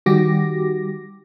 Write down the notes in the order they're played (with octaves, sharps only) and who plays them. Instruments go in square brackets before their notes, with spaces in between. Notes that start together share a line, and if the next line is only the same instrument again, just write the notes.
[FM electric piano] D#3 G3 F#4 G4 D6 A#6